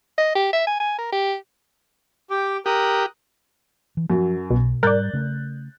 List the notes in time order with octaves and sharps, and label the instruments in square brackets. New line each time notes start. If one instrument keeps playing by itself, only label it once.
[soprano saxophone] D#5
G4
E5
G#5
G#5
A#4
G4
[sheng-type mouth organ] G4 G5 D6
[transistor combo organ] G4 [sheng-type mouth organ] A#4 D#6 F#6
[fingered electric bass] E3
[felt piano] F#2 F#3 [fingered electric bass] F3
[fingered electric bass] B1 [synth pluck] B2
[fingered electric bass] G#2 G3 [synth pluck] A#4 D5 [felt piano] F#6 G6 A6
[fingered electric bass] C#3 A3 C#4